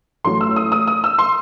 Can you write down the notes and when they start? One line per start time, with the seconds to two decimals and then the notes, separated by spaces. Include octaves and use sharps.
0.24 A1 A2 F#3 A3 C6
0.41 E6
0.56 D#6
0.72 D#6
0.87 D#6
1.04 E6
1.19 C6